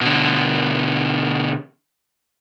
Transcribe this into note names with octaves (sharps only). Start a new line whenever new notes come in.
B2 D3